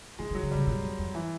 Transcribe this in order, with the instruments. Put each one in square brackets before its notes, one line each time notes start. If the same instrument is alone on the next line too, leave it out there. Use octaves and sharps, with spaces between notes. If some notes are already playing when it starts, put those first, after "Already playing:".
[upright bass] D#3 [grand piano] G#3
[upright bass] D#3
[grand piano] F#3
[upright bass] D3
[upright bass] C#3 [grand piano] G3
[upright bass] B2 [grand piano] F#3
[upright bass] F2
F2
[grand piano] E3